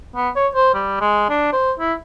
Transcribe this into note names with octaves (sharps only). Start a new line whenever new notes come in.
B3
C#5
C5
G3
G#3
D4
C5
E4